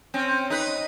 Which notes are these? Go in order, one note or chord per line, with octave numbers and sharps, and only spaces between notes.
C4 C#4
D#4 B4